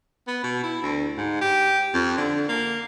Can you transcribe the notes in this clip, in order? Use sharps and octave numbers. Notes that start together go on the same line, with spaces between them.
B3
B2
E4
D2
G#2
G4
F2
D3
A#3